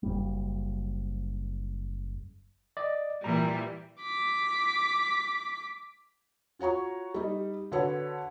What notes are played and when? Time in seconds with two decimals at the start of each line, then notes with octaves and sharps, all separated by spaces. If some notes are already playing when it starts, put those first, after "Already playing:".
0.03 F#1 C2 G3
2.77 D5 D#5
3.24 A#2 E3 G3 A#5
4.03 D6 B6
6.59 F4 F#4 C#5 A#5 C#6
7.14 G3 D#4
7.72 D3 F#4 B4 C#5